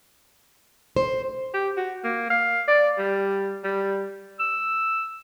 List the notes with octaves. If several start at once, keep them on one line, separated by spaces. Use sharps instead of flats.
C5
G4
F#4
A#3
F5
D5
G3
G3
E6